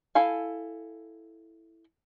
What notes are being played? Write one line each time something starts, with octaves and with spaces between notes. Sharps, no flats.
E4 A4 F5 G#5